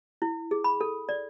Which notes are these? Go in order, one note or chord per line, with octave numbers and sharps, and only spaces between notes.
E4
G#4
B5
A4
D5